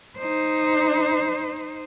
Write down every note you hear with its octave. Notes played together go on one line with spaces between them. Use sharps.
D#4 C5